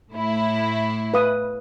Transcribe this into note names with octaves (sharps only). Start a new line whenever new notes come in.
A2 E4
B4 F5 D#6